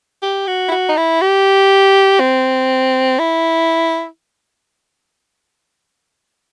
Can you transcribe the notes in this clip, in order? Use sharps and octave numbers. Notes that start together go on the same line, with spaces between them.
G4
F#4
E4
F#4
D#4
E4
G4
C4
E4